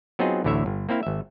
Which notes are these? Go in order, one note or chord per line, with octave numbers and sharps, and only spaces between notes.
F#3 B3 C4 D#4 F4 G#4
A1 D2 D3 E4 C#5 E5
G1
A#3 C4 E4 F5
G#1 E5